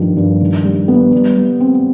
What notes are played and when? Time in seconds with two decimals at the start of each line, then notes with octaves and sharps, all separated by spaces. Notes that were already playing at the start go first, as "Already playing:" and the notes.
Already playing: G2 D#3 F3
0.17 G2
0.41 D#3
0.65 G3
0.88 B3
1.13 G3
1.36 G3
1.60 C4